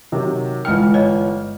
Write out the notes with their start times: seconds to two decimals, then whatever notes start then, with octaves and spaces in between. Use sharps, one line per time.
0.12 C3 D#3 F#3
0.65 G1 E3 G#3 G5 F6
0.94 C#5 D#5